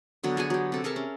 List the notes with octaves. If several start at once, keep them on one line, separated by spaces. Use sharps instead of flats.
D3 F#3 B3
B3 G#4 A4 G#5
F#3 G4
C3 A4
G#4 A#4 E5 A5
C#4